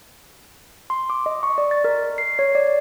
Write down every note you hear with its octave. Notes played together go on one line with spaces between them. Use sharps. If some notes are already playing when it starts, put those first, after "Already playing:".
C6
D6
D#5
C#6
D5
A6
A#4
C7
C#5
D5